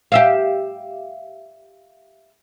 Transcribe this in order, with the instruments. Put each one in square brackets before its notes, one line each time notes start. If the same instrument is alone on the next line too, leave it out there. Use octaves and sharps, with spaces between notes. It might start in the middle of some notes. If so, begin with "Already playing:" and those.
[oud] G4 E5 F5